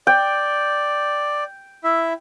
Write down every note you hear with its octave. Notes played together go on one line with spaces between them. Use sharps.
D5 G5
E4 E5